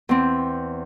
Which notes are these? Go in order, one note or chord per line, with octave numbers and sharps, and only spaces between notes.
E2 C4